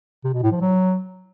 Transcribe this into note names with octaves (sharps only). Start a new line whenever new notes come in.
C3
B2
A2
F3
F#3